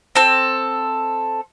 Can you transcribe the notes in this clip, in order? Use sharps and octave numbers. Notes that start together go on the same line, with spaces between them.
C4 A4